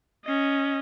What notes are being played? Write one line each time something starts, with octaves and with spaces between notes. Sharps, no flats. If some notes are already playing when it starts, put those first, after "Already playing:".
C#4 D#5